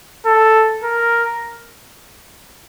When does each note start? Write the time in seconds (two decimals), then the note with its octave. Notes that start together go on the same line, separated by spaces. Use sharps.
0.26 A4
0.83 A#4